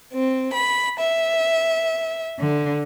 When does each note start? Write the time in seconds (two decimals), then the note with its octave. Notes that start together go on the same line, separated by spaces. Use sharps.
0.13 C4
0.53 B5
1.00 E5
2.40 D3